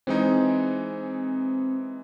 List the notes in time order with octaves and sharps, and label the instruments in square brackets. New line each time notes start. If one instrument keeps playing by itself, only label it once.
[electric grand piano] E3 G#3 D#4 [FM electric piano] C4